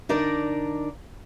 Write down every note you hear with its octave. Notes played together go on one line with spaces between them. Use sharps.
D3 D4 D#4 A#4 D5